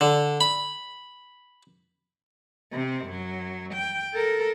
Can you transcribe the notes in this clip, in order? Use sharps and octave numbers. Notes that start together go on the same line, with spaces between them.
D3
B5
C3 C4
F#2 F#3
G5
A4 A#4